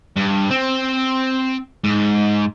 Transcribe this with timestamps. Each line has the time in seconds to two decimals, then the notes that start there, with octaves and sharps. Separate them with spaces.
0.17 G2
0.51 C4
1.84 G#2